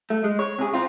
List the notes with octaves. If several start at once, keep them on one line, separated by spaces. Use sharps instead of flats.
A3
G#3
C#5
C3 G#4
C4 F4